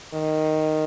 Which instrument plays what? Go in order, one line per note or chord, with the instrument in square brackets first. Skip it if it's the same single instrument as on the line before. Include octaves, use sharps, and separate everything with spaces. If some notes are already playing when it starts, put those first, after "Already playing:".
[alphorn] D#3